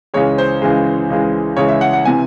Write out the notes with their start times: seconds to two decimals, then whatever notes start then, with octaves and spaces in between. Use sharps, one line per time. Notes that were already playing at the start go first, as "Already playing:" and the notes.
0.14 C#2 C#3 E3 G#3 C#5
0.38 C5
0.62 C#2 C#3 E3 G#3
1.10 C#2 C#3 E3 G#3
1.57 C#2 C#3 E3 G#3 C#5
1.68 E5
1.81 F#5
1.93 F#5
2.05 C3 E3 G#5